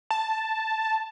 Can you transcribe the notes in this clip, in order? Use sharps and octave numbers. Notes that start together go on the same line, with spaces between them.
A5